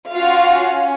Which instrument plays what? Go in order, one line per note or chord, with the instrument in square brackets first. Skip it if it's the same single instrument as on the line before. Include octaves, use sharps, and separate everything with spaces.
[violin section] C#4 F4 F#4 F5